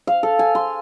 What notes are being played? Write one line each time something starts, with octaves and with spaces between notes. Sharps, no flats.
F5
A4
G#5
C6